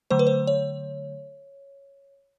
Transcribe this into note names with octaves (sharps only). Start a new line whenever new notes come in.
D3 F#3 A3 C5
B4
C5
C#5